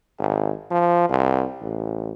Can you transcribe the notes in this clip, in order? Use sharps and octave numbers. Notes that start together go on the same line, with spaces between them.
G#1
F3
C2
A1